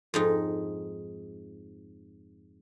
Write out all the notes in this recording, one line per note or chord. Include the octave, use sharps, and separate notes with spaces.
F2 G#2 D#4